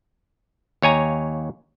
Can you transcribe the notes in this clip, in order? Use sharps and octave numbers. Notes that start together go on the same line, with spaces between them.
D#2 C#5 G#5 A#5